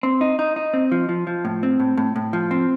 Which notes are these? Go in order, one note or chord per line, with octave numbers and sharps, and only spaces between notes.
C4
D#4
D#4
D#4
C4
F3
F3
F3
A2
C4
A2
A2
A2
F3
C4